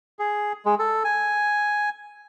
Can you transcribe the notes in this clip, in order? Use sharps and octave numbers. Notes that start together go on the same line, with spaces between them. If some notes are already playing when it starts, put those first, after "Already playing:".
G#4
G#3
A4
G#5